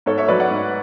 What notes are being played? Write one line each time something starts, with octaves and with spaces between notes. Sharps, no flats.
G#2 A4 C#5
C#5 E5
F#3 B4 D5
D5 F#5
G#2